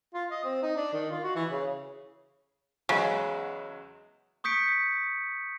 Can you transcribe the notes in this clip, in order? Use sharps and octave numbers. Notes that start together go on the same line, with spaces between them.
F4
D#5
C4
D#4
D4
D#3
F4
F#4
E3
C#3
E2 C#3 F#3 G#3
C#6 D#6 G6 B6 C#7 D7